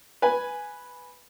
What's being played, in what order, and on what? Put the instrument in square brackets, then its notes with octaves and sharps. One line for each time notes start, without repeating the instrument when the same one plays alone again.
[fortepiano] B4 G#5